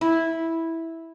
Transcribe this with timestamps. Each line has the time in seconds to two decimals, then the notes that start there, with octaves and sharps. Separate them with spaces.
0.01 E4